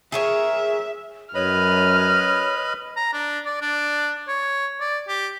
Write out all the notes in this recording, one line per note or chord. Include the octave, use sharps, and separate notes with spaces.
G#4 A#4 C#5 E5
F#2 B4 C#5 D#5 B5 F6
A#5
D4
D5
D4
C#5
D5
G4